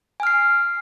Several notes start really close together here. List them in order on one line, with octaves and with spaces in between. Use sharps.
G#5 F6 C7